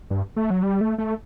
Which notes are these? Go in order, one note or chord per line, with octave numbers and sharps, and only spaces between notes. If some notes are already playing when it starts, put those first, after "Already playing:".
G2
A3
F#3
G3
A3
A3